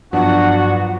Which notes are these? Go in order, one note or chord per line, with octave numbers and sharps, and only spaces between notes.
G2 F3 F#3 B3 D4 F#4 F#5